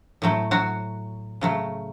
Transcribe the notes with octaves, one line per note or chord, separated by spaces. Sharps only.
A2 F#3 A3
F#3 F#4
C#3 F#3 A3